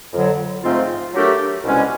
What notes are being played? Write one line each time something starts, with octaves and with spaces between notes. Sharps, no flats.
F2 D3 F#3
G#2 F3 A3 C4 F4
F#3 A3 D4 G4 A#4
C2 B2 G#3 C#4